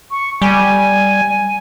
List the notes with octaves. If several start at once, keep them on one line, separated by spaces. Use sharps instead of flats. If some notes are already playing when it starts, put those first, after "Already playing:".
C#6
G3 G#5